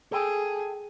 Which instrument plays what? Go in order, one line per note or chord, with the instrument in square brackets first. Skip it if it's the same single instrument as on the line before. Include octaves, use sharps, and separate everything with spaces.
[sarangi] G#4 [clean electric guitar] A4 G5